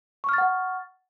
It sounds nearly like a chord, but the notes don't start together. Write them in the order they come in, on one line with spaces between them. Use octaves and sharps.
C#6 F6 A6 F#5